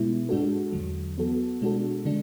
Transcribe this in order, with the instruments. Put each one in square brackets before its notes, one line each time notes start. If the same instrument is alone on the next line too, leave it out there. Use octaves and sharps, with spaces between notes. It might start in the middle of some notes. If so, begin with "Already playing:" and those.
Already playing: [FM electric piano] B2 G#3 B3 E4
G#2 G#3 D4 F#4 A4
E2 D3 F#3
E3 B3 F#4 A4
B2 G#3 D4 F#4 A4
D3 G#3 D4